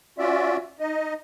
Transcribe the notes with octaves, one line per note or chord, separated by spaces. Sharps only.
C#4 F4 F#4 D5 E5
D#4 D#5